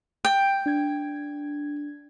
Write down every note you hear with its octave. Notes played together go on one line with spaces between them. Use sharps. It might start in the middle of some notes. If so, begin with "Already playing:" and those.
G5
D4 G#6